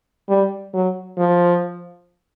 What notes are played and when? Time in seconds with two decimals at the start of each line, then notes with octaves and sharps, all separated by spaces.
0.29 G3
0.74 F#3
1.18 F3